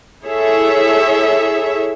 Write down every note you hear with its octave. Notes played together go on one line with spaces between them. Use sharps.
E4 G#4 A4 C#5 E5